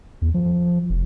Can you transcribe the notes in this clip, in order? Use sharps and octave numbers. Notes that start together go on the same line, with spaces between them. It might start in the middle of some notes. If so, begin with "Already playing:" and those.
E2
F3
F1